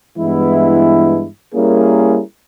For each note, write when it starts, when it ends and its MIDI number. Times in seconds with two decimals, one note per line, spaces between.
0.18 1.27 43
0.18 1.27 52
0.18 1.27 56
0.18 1.27 59
0.18 1.27 64
1.55 2.20 55
1.55 2.20 58
1.55 2.20 61
1.55 2.20 64
1.55 2.20 68
1.55 2.20 70